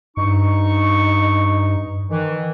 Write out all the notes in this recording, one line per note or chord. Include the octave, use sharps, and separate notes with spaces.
G2 D#4 C#6
D#3 E3